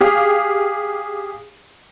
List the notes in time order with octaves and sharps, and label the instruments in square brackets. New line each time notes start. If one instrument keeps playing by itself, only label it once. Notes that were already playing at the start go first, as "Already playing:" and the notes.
[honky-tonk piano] G4 G#4 F5